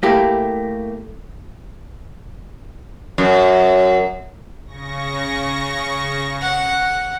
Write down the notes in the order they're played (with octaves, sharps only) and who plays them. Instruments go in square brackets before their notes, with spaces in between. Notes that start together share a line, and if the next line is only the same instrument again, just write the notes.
[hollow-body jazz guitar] A3 A#3 E4 G4
[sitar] F#2
[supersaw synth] C#3 C#6 A#6
[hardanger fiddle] F#5